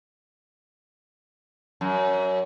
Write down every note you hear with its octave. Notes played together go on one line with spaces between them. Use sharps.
F#2